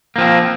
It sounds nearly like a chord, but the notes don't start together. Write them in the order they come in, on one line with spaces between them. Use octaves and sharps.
A#3 F3 C4